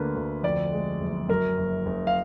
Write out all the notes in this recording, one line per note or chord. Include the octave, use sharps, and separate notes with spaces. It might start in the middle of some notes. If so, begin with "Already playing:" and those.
Already playing: D2 D3 A#3 B4
D2
F2 D5
G#3
F#1
F#2 A#4
F#1
F#1
F5